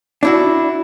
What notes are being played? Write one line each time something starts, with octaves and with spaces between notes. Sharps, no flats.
D4 E4 F#4